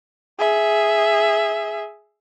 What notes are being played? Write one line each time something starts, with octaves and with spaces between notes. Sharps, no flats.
G#4 E5